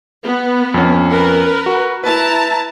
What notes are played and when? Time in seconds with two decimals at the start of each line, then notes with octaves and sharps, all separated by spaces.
0.24 B3
0.74 F2 C#4
1.11 A#4 B4
1.66 F#4
2.04 E4 B4 A5 A#5